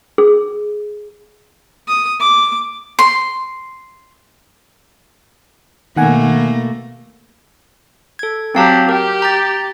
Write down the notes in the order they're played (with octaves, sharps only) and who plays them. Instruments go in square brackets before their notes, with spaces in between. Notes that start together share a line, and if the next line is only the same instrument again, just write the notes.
[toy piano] G#4
[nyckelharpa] D#6
D6
[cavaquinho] C6
[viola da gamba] B2 A3 A#3 [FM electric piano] D#3 F#5 G#5
[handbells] A4 G#6
[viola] F#3 G4 [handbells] C4 F5 A5
[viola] G4 [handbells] A#4
[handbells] A#5 A6